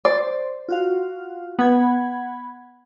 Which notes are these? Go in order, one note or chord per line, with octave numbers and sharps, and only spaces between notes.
C5 D5
F4 F#4 F5
B3 F#5 B5 G#6